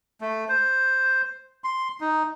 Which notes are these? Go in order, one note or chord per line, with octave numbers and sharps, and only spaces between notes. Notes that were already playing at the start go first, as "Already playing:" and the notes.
A3
C5
C6
D#4